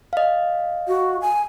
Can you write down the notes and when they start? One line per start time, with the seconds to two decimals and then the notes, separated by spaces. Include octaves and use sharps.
0.13 D#5 F5
0.88 F#4
1.22 G#5